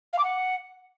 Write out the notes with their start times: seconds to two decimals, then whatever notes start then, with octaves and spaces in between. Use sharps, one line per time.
0.13 F5
0.18 D6
0.23 F#5